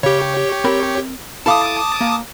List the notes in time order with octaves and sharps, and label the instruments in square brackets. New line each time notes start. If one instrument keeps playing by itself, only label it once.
[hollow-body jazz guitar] C#3 [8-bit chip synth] G4 C#5
[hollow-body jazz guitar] C4 A#4 B5
[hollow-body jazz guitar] E4 A4 F5 [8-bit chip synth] A5 D6 D#6
[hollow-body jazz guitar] A#3